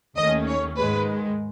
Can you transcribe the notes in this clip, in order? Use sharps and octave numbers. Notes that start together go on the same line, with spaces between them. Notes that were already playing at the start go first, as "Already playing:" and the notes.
D#2 D#3 A3 C#4 D#5
C#5
G#2 D#3 G#3 B4